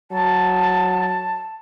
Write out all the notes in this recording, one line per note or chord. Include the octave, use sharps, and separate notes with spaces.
F#3 A5